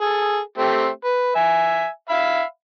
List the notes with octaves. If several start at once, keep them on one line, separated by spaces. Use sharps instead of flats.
G#4 A4
A3 C4 G4
B4
E5 G#5
E5 F5 B5